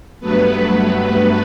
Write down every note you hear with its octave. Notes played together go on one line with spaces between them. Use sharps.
G2 F#3 A3 B3 B4